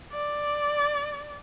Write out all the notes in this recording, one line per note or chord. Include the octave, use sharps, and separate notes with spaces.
D5